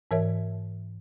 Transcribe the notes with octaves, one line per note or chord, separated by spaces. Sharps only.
G#2 E3 A#4 C#5 E5